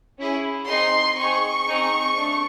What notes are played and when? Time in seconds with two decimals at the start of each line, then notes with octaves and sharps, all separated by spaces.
0.18 C#4 E4 G#4
0.68 C4 D#4 G#4 C6
1.17 C4 D#4 G#4 C#6
1.67 C4 D#4 G#4
2.17 A3 D4